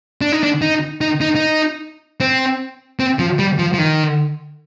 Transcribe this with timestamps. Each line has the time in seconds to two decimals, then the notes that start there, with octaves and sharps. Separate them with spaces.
0.21 D4
0.32 D#4
0.43 D4
0.62 D#4
1.01 D#4
1.21 D#4
1.35 D#4
2.20 C4
3.00 C4
3.19 F3
3.39 G3
3.59 F3
3.74 F3
3.78 D#3